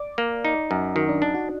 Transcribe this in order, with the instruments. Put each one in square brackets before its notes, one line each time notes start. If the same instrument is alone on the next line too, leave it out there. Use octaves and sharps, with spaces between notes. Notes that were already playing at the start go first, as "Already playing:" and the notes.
Already playing: [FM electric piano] D5 D6
[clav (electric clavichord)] A#3
D#4
F#2
[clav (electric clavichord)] D#3 [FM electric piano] F#4 F#5
[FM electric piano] D4 D5
[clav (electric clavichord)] D4 [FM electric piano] D#4 D#5
[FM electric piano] F#4 F#5